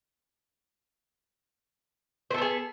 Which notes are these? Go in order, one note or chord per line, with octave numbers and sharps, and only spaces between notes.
B3 G#4 A4 C5